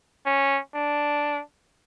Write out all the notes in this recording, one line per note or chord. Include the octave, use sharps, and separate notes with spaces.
C#4
D4